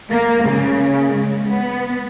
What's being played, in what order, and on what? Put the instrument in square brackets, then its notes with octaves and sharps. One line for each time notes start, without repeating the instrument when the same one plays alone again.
[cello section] A#3
C#3
G#3
B3